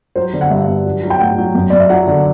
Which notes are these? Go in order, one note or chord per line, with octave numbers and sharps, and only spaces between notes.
F#3 C5
D3
F#5
G2 E5
G2
F#3
F#3
G5
A2 F#5
F#3
F#2
F#2 D5
E5
F#3 F#5
D3